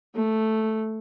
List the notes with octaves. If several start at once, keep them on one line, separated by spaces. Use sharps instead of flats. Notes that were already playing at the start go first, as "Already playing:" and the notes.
A3